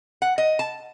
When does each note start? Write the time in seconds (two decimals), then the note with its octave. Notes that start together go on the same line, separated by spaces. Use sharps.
0.22 F#5
0.38 D#5
0.59 A5